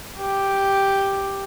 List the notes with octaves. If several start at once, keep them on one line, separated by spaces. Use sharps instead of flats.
G4